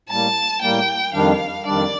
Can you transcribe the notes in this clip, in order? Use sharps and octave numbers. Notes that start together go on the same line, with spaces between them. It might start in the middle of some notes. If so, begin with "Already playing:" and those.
A2 G3 A#3 A5
A2 G3 A#3 G5
F2 D#3 G3 D4 F5
F2 D#3 G3 D4 D5